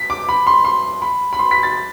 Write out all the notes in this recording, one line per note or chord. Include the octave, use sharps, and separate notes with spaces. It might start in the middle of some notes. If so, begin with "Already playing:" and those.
Already playing: B6
D6
B5
C6
C6
B5
B5
C6
B6
A6